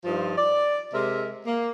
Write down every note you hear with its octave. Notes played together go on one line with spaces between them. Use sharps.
G2 F3 D#4 F4
D5
C3 G#3 A#4 E5
A#3